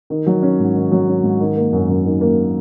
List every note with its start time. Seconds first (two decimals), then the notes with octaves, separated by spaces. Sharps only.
0.10 D#3
0.26 F#3
0.42 C#4
0.59 G#2
0.75 D#3
0.92 F#3
1.08 C#4
1.23 G#2
1.40 D#3
1.56 A#3
1.73 F#2
1.89 F#2
2.06 D#3
2.21 A#3